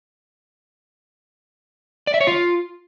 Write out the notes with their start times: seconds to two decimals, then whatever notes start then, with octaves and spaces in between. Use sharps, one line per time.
2.07 D5
2.14 E5
2.21 C#5
2.27 F4